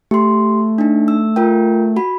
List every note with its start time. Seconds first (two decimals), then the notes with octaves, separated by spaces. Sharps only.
0.11 A3 G4 C6
0.78 D4 D#4
1.08 E6
1.36 F4 A#4 G5
1.96 F#4 B5